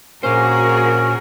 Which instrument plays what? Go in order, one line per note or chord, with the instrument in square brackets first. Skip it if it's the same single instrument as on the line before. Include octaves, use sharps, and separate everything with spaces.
[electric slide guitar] A#2 C5 [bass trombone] A#3 [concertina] C#4 [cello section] F#4 G#4 A#4